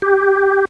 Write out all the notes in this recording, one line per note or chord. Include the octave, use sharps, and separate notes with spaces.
G4